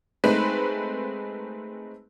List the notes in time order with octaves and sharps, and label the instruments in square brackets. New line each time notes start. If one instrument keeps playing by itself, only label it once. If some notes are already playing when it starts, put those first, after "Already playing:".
[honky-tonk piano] G#3 A3 C4 D#4 B4